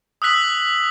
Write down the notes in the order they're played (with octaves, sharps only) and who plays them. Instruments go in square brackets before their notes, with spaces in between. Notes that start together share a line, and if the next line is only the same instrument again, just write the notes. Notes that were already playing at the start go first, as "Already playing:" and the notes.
[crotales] D#6 E6 F#6 B6 F#7